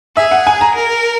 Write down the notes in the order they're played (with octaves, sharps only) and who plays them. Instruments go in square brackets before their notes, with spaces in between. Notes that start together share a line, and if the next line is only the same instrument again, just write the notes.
[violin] G#4 [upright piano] E5
[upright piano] F#5
G#5
A#5
[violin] A#4